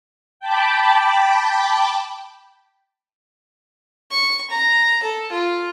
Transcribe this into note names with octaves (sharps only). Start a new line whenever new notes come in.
G5 A5 B5 D6
C#6
A#5
A4
F4